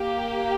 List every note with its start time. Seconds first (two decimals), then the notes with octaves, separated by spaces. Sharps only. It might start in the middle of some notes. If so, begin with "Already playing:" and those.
Already playing: A#3 G4